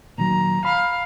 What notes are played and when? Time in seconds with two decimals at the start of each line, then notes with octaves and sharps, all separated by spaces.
0.18 A#2 D#3 F#3 A#5
0.65 F5 B5